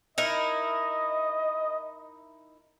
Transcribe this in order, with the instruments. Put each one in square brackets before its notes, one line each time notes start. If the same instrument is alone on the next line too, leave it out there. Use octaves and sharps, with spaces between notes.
[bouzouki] D#4 E4 A#4 [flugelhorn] D#5